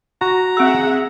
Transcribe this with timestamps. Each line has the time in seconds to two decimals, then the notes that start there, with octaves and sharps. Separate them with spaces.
0.21 F#4 A#5
0.57 C4 G#4 E5 F#5 E6